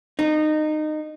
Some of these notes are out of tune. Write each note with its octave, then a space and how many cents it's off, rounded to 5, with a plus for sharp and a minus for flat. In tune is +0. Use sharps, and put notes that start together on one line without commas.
D#4 -20